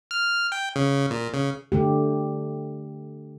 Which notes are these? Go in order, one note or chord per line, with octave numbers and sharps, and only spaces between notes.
F6
G5
C#3
A#2
C#3
D3 A3 G4